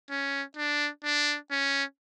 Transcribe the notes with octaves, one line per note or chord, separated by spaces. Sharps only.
C#4
D4
D4
C#4